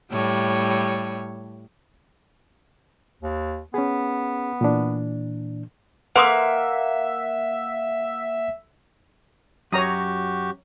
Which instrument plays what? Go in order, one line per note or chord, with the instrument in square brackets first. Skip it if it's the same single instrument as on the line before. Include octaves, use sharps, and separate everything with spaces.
[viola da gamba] A2 G3 C#5
[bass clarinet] D#2
[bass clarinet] B3 [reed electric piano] C#4 G#4
[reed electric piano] A#2 E3 D4
[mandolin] A#3 [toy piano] B4 C6 D#6 [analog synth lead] E5 [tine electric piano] F#5
[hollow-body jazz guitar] F#2 [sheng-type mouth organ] F#4 G4 [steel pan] C#5 A#5 D#6